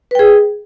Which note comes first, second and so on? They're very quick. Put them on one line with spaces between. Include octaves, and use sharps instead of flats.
B4 G5 G#4